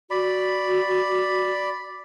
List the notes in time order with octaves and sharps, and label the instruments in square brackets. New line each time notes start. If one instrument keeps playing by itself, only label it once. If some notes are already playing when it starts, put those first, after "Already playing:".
[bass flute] F#4 [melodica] D5 B5